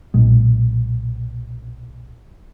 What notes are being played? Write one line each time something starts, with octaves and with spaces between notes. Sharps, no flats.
B1 A#2 G#3